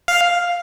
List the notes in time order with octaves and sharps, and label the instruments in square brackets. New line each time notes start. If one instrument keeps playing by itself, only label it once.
[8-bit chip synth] F5